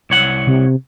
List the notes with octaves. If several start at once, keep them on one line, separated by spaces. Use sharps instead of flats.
C2 C#5 F#5
C3